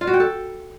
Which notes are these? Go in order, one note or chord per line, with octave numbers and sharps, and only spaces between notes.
F4
F#4
G5
A4